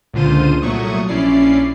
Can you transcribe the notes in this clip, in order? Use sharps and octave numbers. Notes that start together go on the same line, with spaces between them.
C#2 A#2 D3 F4 C5 D#7
C2 A#2 F#3 A3 C#6 D#6
A#1 C#4 E4 D5 C7